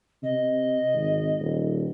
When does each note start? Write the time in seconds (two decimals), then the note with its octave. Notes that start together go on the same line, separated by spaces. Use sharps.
0.23 C3 D#5
0.94 G#1
1.39 D#1